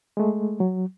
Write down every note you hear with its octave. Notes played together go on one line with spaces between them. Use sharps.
G#3 A3
F#3